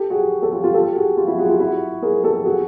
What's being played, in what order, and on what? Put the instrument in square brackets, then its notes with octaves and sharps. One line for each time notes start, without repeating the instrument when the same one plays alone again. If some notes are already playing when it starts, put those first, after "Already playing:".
Already playing: [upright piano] G4 A4
F#4 G#4
G4 A4
F4 G4
F4 G4
G4 A4
F#4 G#4
F4 G4
E4 F#4
F#4 G#4
F4 G4
E4 F#4
G#4 A#4
G4 A4
F#4 G#4